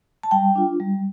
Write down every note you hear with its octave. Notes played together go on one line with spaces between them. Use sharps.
A5
G3 G5
D4 F4
G3